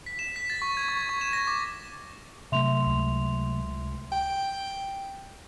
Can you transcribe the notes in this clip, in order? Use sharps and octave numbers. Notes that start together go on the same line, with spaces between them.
B6
E7
B6
A6
C#6
G#6
C#6
C#6
E7
A#6
D6
C3 F#3 A3 E5 C6 F7
C#2
G5